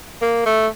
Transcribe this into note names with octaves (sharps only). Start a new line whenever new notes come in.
A#3
A3